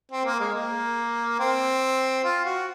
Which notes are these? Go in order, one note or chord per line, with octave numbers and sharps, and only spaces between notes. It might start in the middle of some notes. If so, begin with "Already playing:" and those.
C4
A#3
G#3
A#3
C4
F4
F#4